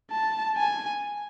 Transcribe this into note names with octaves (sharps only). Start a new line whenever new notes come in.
A5
G#5